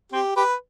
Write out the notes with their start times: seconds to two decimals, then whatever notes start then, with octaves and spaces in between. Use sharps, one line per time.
0.12 C4 G4
0.36 G4 B4